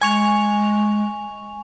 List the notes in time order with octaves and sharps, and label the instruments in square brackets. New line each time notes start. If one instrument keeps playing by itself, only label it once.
[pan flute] G#3 [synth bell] G#5 C#6 F7